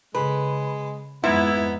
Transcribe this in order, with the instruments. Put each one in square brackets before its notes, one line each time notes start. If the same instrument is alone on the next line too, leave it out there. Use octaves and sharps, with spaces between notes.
[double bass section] C#3 [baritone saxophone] G#3 [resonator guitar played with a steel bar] B4
[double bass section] F2 G#3 [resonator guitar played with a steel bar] G#2 [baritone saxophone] B3 [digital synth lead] E4